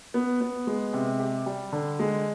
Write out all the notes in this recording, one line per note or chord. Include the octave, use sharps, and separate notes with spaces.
B3
B3
G#3
C3
G4
G3
D3
G#3